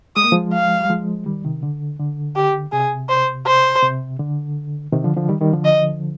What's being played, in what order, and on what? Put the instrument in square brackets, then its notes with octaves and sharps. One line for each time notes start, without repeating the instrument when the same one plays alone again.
[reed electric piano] G#3 [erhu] D#6
[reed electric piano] A#3
F3 G#3
[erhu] F5
[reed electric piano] G3
F3 G#3
D#3 G3
C3 D#3
D3
D3
[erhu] G4
[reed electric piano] C3 [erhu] G#4
[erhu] C5
C5
[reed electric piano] C3
D3
C3 D#3
D3 F3
D3 F3
D#3 G3
D#3 G3
D3 F3
[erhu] D#5